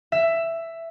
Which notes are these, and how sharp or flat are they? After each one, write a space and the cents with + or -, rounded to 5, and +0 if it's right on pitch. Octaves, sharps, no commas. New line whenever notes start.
E5 +10